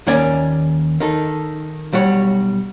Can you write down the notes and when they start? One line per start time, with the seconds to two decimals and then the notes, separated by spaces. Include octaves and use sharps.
0.07 D#2 D#3 A#3 C#4 D5 G#5
1.00 D#3 D#4 A4
1.93 B1 G3 F#4 C#5